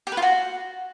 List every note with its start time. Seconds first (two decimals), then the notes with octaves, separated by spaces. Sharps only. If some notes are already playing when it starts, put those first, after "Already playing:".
0.07 G4
0.12 B4
0.17 F4
0.22 F#4